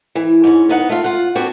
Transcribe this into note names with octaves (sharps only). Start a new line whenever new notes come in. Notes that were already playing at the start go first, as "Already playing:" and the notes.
E3
G#2 C#4
B3 D#4 F#5
A3 F4
F4 F#5
B3 C4 D4 F#4